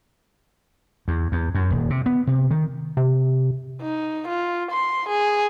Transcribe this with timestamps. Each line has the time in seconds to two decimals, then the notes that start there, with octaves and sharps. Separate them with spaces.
1.08 E2
1.32 E2
1.55 F#2
1.71 D#1
1.90 C3
2.06 B3
2.27 C3
2.51 D#3
2.97 C3
3.82 D#4
4.28 F4
4.71 C6
5.09 G#4